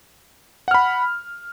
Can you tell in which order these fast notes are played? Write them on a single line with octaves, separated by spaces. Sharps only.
F#5 F6 B5